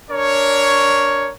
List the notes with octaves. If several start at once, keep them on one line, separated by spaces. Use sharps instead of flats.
D4 A#4 C#5